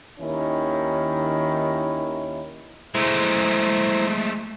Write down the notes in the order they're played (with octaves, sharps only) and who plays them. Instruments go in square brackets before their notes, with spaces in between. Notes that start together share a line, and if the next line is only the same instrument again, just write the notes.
[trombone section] D#2 D#3 C#4 E4
[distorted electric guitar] G#3 A3 [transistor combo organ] E4 C5 A#5